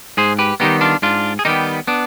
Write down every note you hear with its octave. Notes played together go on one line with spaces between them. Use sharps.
G#2 G#4 C5
G4 B4
D#3 G3 B3 D#4 G4
D4 F4
G#2 D4 F4
G#4
D#3 G3 B3 D#4 G4
B3 D4